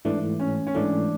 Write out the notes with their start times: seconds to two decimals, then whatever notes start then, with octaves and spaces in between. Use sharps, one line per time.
0.05 G#2 E3 A3 D4
0.39 C#4
0.67 C#4
0.75 G#2 E3 A3 D4